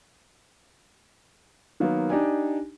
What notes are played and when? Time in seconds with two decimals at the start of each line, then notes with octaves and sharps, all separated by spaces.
1.80 D#3 F#3 A#3 B3
2.10 D4 D#4 G4 D5 G#5